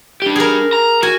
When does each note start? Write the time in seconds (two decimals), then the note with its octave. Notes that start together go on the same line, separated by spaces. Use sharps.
0.22 D4 G4
0.36 G#4 A#4
0.73 A#5
1.03 F#4 G#5